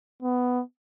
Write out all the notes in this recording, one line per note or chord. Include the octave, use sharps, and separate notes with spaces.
B3